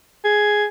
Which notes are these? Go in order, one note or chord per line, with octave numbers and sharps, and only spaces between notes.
G#4